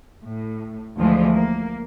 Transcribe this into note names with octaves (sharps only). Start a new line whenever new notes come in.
A2
D2 E3 F3 G#3
A#3